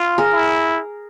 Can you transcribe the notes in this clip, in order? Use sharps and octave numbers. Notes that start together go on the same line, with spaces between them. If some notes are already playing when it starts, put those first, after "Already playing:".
Already playing: F4
G#4 A#4
E4